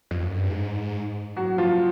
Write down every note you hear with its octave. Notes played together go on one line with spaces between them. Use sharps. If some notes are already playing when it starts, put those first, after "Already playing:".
F2
F#2
G2
G#2
F#3 F#4
F3 F4